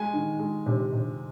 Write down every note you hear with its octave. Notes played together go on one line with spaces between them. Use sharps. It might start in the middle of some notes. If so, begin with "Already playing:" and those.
Already playing: G#3 G#5
D#3
G#3
C3
C3